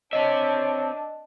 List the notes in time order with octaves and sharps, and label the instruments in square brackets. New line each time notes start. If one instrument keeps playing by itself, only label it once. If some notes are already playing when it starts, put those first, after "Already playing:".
[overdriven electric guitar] C4 E5 [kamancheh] D4 A5 [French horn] C#5 [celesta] D#5